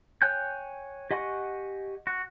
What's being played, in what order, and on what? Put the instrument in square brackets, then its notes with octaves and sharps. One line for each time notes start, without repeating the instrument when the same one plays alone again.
[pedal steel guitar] C#5 G5 G#5 F#6 G6
G4 D#5 F#5 G#5 C#6
F#4